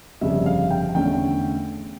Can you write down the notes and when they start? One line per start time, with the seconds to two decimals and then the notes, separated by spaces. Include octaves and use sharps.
0.21 G1 F2 C#3 G3 E5
0.46 F5
0.71 G5
0.95 E2 D3 A3 C#4 G5